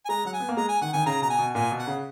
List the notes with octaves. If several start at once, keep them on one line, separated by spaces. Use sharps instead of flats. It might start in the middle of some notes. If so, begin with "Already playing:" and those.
G#5
G#3 A#5
F#3 F#5
G#5
B3
A#3
G#3 A#5
G#5
D#3 F#5
D#3 G#5
C#3 A#5
B2 A#5
G#5
B2
A#2 G#5
B2
F#5
C#3